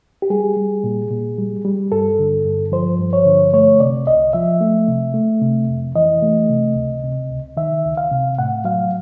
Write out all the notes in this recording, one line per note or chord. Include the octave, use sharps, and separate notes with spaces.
G4
G3 G#4
G3
A#2
A#2
G3
G3
G2 A4
D3
G2
F3 C5
G2
C#5
D3
A3 C#5
C3 D5
C2 D#5
F3 E5
A3
C3
A3
C3
F2
E3 D#5
A3
C3
C#2
C3
C#2
D#3 E5
C#2
F5
C3
A2 F#5
F#3 F5